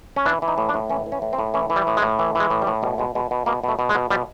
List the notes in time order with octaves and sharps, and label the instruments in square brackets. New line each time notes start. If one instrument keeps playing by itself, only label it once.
[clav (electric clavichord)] C#4
E3 D4
E3
D#4
A2
D4
A2
E3 C#4
E3
C#4
A2
C4
A2
E3 C#4
E3
G3
A2
G#3
A2
E3
E3 G#3
A2
G3
A2
B2 G3
B2 G#3
B2 G#3
B2
B2 A#3
B2 A3
B2
G#3
B2
B2 G3